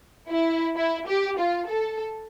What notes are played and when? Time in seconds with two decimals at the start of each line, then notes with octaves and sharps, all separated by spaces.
0.30 E4
0.76 E4
1.07 G4
1.38 F4
1.68 A4